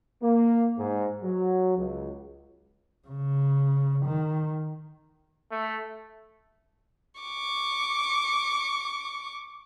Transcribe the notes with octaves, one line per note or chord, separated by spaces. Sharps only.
A#3
G#2
F#3
C#2
C#3
D#3
A3
C#6 D6